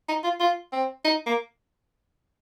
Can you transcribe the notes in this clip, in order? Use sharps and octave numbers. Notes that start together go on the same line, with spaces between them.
D#4
F4
F4
C4
D#4
A#3